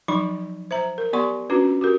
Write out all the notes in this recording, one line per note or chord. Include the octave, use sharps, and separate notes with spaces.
F3 F#3 D#4 B5 C#6
C5 E5 A#5
A#4
B3 G4 D5 F#5 C6 C#6
C#4 D4 F4 F#4 B4
F#4 G4 A#4